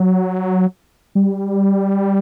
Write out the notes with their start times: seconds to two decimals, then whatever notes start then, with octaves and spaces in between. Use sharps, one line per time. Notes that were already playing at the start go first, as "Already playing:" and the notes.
Already playing: F#3
1.15 G3